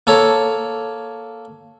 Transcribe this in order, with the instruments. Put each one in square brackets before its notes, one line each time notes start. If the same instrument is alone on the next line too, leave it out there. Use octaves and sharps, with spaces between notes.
[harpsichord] A#3 A4 C#5